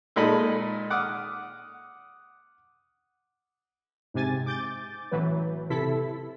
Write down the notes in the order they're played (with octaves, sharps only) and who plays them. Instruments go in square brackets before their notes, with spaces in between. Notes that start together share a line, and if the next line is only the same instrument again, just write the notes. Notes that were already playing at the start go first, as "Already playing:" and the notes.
[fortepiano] A#2 G#3 D#4 A4 D#5 B5
F#5 D6 D#6 F6
[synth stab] G#2 C3 G#5 A6
D6 G6 A6
A1 E3 F#3 B4
C3 E4 A4 B6